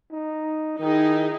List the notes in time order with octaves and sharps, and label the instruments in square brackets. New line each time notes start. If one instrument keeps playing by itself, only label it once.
[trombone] D#4
[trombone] D#3 [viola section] D#4 E4 G#4